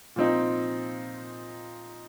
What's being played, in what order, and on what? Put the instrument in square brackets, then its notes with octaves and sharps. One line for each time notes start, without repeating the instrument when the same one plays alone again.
[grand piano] A#2 F3 C4 D#4